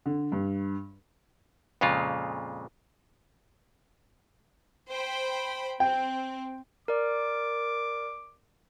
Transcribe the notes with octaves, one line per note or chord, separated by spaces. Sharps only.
D3
G2
F2 A#2 C#3 G#3 F4
C5 G5 B5
C4 G5
A#4 D5 D6